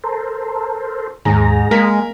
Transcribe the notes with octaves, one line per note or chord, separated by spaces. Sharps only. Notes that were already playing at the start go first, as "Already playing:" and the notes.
A4 A#4 C5
D#2 G#2 G#4 A#5
G#3 A#3 A#4 B6